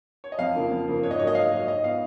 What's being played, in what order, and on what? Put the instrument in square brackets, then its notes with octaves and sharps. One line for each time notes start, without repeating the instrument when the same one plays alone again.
[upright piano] C#5
D#5
F2 F5
C#3 F3 A#3
F2
C#3 F3 A#3
G#2 C#5
D#5
F#3 C#5
A#3 D#5
G#2 F5
F#3 A#3 D#5
G#2 D#5
F3 B3 F5